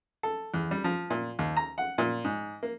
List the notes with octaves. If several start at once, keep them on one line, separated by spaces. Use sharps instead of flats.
A4
E2
G3
F3
A#2
D#2
A#5
F#5
A#2
G#2
A#3